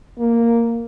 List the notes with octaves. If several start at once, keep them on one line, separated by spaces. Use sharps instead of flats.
A#3